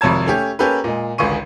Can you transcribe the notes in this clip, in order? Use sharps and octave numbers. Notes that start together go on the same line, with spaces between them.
G#1 F2 C3 C#5 A5 G#6
A3 C#4 G4
A#3 C#4 G4 A4 B4
A#2 G#3
G#1 C#2 D3 G#4 C#6 D#7